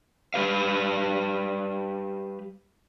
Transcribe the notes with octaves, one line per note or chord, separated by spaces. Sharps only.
G3 G4 B4 F5